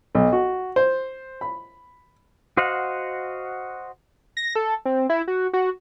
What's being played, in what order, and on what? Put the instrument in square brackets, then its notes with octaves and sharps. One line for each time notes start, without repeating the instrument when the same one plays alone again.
[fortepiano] B1
F#4
C5
B5
[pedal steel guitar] F#4 C5 D#5 F5 F#5
[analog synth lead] A#6
A4
C4
E4
F#4
F#4